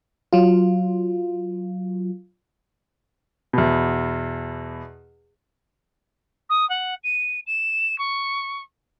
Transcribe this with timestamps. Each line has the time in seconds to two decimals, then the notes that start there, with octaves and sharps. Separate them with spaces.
0.33 F#3 F4
3.53 E2 B2
6.50 D#6
6.70 F#5
7.04 D#7
7.47 E7
7.99 C#6